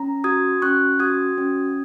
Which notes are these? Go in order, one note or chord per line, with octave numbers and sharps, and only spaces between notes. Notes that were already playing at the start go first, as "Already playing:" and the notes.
Already playing: C#4 A#5
F#4 D#6 G#6
C#4 C#6 F#6
F#4 D#6 G#6
C#4